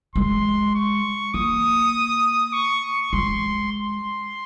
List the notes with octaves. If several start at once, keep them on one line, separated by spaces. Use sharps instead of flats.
G#3 C6
C#6
A#3 D#6
C#6
G#3 C6
C6